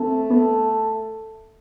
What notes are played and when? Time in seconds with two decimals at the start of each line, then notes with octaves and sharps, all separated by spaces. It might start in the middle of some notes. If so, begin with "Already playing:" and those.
Already playing: A3 C4
0.30 B3